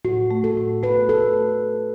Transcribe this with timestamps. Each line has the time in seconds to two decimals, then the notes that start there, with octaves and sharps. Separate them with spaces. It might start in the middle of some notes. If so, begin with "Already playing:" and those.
0.05 A2 F#4
0.31 A3
0.44 A4
0.57 A2
0.83 A3 B4
1.09 A3 A4